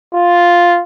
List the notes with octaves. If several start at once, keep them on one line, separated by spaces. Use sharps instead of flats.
F4